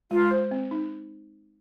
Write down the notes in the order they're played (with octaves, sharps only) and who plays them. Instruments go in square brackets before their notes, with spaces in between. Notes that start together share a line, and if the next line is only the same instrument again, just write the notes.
[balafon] G#3 [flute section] F4
[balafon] C5
C4
D#4